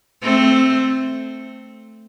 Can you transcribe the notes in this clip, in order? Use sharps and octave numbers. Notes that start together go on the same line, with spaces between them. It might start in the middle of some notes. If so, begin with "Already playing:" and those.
A3 C4